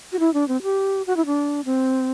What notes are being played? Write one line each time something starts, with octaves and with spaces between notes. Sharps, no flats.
F#4
E4
D4
C4
G4
F#4
E4
D4
C4